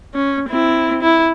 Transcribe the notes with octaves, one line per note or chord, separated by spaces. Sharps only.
C#4
C4 E4
E4